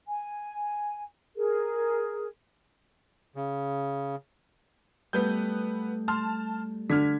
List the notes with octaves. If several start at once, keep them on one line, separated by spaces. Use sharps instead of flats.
G#5
G#4 A#4
C#3
G3 A3 B3 B4 G6
A5 C6 F6
D3 F6 G#6 B6